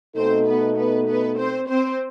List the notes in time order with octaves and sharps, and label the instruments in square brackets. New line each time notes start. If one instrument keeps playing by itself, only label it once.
[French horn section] B2 A3 D#4 A4 [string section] C4 C5
[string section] B3 B4
B3 B4
B3 B4
C4 C5
C4 C5